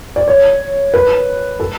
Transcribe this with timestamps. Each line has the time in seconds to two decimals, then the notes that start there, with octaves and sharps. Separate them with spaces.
0.16 D5
0.28 C#5
0.94 B4
1.60 A4